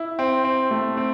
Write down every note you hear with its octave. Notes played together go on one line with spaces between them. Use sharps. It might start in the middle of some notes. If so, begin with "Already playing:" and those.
Already playing: E4
C4
C4
A3
C4